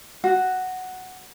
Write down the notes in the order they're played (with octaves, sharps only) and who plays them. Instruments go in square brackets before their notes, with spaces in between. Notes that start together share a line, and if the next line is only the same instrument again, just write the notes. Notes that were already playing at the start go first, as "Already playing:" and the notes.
[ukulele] F#4